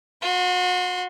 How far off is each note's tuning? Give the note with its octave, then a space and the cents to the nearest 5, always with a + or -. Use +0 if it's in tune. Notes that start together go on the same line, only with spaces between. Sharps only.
F#4 -35 C6 +0